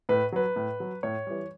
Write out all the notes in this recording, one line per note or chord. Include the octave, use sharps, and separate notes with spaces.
A2 B4
F#3 B4
A2
F#3
A2 C#5
E3 G3